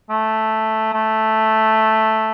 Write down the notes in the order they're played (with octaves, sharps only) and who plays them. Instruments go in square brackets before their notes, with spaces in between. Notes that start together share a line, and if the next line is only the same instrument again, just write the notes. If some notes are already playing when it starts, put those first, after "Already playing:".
[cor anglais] A3
A3